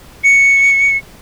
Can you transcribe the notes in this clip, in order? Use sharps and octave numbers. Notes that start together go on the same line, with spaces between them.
C#7